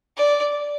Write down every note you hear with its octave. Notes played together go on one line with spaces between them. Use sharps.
D5